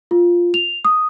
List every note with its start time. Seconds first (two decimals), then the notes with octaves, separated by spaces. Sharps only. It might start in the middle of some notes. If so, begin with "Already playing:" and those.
0.11 F4
0.54 F7
0.85 D#6